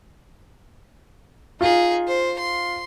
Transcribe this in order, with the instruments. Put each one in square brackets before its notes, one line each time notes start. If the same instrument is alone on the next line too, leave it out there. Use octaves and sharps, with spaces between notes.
[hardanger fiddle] D#4 G#4 [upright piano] F4
[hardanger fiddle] C5
C6